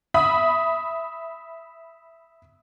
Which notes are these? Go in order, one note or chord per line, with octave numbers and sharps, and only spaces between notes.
E5 B5 D#6